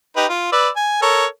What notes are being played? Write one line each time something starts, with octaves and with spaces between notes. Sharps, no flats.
D#4 G4 B4
F4
B4 D5 E6
G#5
A4 A#4 C#5